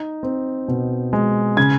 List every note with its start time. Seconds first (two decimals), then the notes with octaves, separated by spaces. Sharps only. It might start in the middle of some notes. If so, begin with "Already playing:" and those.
Already playing: D#4
0.23 C4
0.68 B2
1.13 G#3
1.57 C#3 G#6